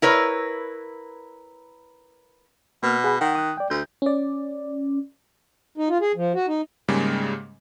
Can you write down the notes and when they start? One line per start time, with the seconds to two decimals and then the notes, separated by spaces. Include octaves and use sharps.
0.02 E4 A#4 B4 C#5
2.83 B2 A#3 F6
3.04 G#4 F#5 B5
3.21 D#3 F#5
3.35 D#6 F#6
3.57 D5 G5
3.70 D2 G6
4.02 C#4 D5
5.78 D#4
5.89 F4
6.01 G#4
6.16 F3
6.35 F#4
6.48 D#4
6.88 G#2 C#3 G3 G#3 A#3